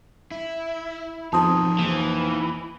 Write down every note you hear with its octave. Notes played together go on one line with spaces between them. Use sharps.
E4
F2 B2 D#4 F#4 G#4 C5 A5 D#6
E3 A#3 D#4